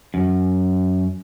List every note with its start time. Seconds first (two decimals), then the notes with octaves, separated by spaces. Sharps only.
0.14 F#2